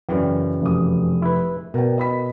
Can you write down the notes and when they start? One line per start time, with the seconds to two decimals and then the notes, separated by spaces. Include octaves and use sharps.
0.09 F#2 C#3 E3 D5 G5
0.62 F1 D#6
1.22 E4 B4
1.74 B2 A#4 D5 G5
1.98 D#5 B5 B6